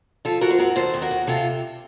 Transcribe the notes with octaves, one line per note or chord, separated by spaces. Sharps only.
F3 F4 A4
F3 F#4 A#4
C5
F#2 F#4 A#4
D#2 A4 C5
D#2
F#4 A#4
D#2
C3 F4 A4